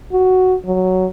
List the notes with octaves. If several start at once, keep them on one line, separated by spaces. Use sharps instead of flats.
F#4
F#3